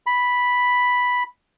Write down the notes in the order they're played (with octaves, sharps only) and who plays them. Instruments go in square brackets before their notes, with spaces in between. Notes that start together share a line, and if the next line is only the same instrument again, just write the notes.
[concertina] B5